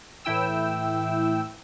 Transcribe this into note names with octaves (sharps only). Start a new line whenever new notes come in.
A2 E3 E4 G5 E6